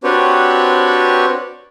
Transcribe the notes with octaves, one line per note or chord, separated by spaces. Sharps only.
C4 D4 F#4 G4 B4 C#5